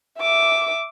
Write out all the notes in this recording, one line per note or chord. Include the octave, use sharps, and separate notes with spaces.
E5 D6